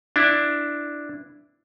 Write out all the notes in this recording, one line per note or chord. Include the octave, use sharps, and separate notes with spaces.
D4 E4